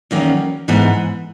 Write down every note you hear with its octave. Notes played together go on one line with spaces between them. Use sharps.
E2 D#3 F#3 A#3 C#4
G#2 E3 B3